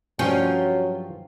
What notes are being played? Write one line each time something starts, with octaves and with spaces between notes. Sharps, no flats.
G2 F3 F#3 C#4 F4 G5